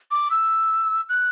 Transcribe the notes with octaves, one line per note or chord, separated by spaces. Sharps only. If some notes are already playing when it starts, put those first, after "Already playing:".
D6
E6
F#6